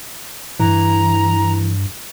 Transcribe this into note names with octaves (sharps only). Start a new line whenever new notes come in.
G2 E3 A#5